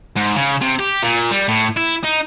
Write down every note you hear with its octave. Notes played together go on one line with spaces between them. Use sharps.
G#2
C#3
C3
G4
A#2
G3
A2
E4
D#4